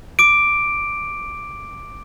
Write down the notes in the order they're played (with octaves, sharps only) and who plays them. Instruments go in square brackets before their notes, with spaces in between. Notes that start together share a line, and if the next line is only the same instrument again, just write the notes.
[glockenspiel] D6 D7